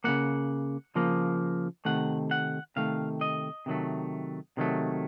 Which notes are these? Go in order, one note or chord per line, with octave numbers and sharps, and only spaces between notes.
C#3 F3 A#3 F#5
C#3 F3 A#3
C3 D#3 A3 F#5
F#5
C3 D#3 A3 F5
D#5
C3 D#3 F#3 A3
C3 D#3 F#3 A3